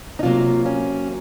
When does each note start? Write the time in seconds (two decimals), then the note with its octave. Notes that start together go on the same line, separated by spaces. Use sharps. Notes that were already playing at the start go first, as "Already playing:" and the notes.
0.19 D#4
0.23 C3 F#3 A#3 F4
0.66 C#4